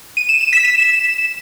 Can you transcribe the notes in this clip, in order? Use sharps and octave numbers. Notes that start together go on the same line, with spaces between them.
D#7
E7
E7
B6
E7